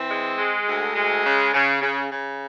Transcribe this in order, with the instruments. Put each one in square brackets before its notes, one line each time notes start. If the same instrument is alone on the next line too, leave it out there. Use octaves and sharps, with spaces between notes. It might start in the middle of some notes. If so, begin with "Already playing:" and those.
Already playing: [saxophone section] E3 C4
G#3
G#3
D2
G#3
C#3
C#3
C#3
C#3